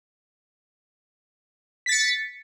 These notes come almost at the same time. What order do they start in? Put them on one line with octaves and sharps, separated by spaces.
B6 A6 C#7